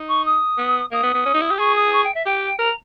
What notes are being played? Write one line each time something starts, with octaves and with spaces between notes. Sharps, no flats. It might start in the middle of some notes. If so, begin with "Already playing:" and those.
Already playing: D#4
C#6
D#6
B3
A#3 D#6
B3
B3
C#4
D#4
E4
G4
G#4 C#6
D#6
C#6
G5
E5
G4 G5
A#4 A#5